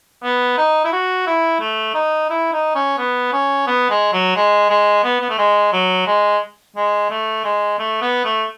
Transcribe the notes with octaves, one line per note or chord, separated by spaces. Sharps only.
B3
D#4
E4
F#4
E4
A3
D#4
E4
D#4
C#4
B3
C#4
B3
G#3
F#3
G#3
G#3
B3
B3
A3
G#3
F#3
G#3
G#3
A3
G#3
A3
B3
A3